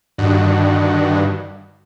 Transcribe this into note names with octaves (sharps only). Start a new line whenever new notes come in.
G2 D3 D#3 F#4